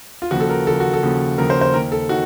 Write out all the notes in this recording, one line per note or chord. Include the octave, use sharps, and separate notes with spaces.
F4
D#2 C#3 F3 F#4
A4
A#4
D#2 C#3 F3 A4
F#4
A4
D#2 C#3 F3
D#2 C#3 F3 A#4
C5
C5
D#2 D#3 A#4
A4
D#3 F#4